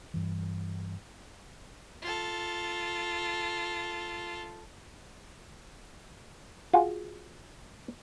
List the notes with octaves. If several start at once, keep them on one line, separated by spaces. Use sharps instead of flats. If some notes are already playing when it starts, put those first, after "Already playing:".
G2 E3
F4 A4
F4 F#4 G#4